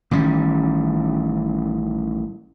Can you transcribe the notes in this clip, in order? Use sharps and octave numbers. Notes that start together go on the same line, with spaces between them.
A1 D#3 G3 C#4